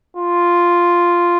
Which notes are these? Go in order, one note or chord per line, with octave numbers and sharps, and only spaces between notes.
F4